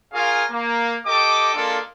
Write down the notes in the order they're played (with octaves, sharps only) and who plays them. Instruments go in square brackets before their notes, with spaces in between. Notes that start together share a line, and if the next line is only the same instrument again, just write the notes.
[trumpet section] C#4 F4 G#4 A#4 F5 G#5
A#3
G4 A4 D#5 G5 D6
G#3 A#3 D4 F4 A4